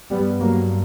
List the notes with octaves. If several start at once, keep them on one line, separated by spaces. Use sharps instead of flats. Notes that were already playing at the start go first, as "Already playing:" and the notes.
G2 G3 B3
F#3 A#3